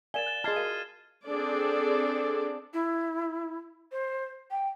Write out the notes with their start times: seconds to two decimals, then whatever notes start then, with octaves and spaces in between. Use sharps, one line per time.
0.14 A#4 D5 F5 G#5 A6 E7 G7
0.26 F#6 A6
0.44 F4 G#4 D#5 A5 C6 F6 G#6 C7
0.56 F#4 A#4 F5 D#7
1.27 C4 D4 G#4 A4 D5
2.74 E4
3.92 C5
4.51 G5